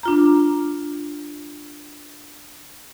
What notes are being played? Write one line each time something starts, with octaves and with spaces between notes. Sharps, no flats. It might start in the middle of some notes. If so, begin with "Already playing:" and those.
D4 F4 A#5